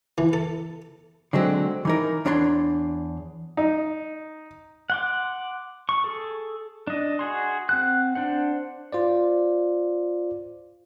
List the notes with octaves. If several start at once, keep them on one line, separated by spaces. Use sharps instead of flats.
E3
A4
D3 F#3 G#3 C4
E3 D#4 A#4
E2 D4 C#5 A#5 C6
D#4
F#5 C6 D6
C#6
G#4 A4
D4 D#5
F#4 G#4 C6
C4 F#5 F#6
D4 C5 F#5
F4 C5 D5